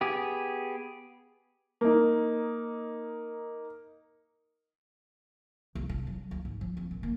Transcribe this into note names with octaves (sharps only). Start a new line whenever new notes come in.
B3 G4 G#4
A#3 D#4
C2
D4
F#3
D2
G#2
F3
C4
A#1
A#3